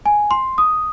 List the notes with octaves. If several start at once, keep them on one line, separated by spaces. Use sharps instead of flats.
G#5
C6
D#6